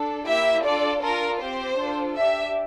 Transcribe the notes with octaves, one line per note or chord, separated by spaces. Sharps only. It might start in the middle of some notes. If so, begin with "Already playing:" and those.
Already playing: D4 A4
A#3 E4 G4 E5
D4 F4 A4 D5
D4 F4 A4 A#4
C4 G4 C5
D4 F4 A4
D4 G4 E5